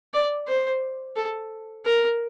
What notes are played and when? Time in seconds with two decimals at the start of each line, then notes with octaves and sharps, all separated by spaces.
0.14 D5
0.48 C5
1.16 A4
1.85 A#4